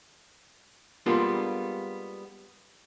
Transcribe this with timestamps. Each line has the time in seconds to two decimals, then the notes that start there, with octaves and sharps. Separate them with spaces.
1.06 G3 G#3 A#3 B3 D4 F4